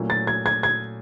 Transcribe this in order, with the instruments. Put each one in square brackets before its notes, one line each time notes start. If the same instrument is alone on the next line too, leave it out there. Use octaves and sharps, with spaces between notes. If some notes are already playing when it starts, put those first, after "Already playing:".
Already playing: [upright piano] A#2 F#3 A3 C#4 E4
[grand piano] A6
G#6
G#6
G#6